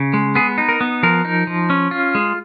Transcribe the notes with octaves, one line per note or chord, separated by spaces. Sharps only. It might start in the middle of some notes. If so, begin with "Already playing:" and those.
Already playing: C#3
G#3
B3 G#4
D#4
A#4
B3
F3 A#4
D#4
F3
C#4
F4
G#3